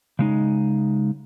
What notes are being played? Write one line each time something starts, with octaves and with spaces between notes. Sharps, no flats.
C#3 G#3 D#4